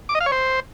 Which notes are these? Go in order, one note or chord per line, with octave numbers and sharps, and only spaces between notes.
D6
D#5
F5
C#5
C5